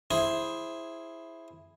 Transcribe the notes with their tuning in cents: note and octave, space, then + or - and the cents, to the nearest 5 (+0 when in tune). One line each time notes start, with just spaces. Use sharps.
E4 +0 G#4 +0 C5 +10